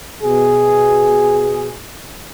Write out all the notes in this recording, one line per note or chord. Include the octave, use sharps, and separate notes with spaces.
B2 G#4